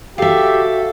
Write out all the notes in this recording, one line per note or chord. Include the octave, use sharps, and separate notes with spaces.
F#4 G4 A4 E5 F5